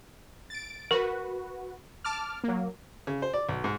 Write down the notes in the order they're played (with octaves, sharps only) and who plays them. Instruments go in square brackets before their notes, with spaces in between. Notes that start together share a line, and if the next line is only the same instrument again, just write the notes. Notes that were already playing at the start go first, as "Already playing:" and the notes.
[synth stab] A6 D7
[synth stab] F#4 B4 [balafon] A#4
[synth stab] A5 D6 F6
F#3 A#3
[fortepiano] C#3
C5
D5
B1
G#2